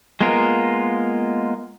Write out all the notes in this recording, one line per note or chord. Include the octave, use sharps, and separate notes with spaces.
G#3 A#3 B3 F4 A#4